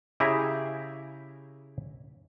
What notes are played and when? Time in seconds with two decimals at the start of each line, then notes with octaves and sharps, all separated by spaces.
0.20 C#3 E4 G4 G#4 E5 A#5